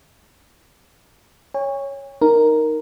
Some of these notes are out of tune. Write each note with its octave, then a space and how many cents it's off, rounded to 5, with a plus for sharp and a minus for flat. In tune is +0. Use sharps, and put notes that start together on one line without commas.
C#5 +0 G#5 -45
D#4 +0 A#4 +0